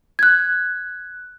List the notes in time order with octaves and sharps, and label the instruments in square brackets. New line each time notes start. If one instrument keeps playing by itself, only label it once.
[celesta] F#6 G#6